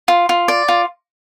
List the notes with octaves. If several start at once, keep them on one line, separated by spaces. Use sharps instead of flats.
F4
F4
D5
F4